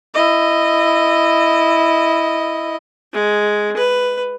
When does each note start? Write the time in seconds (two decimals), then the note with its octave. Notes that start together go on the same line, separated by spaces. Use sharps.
0.14 E4 D#5
3.13 G#3
3.77 B4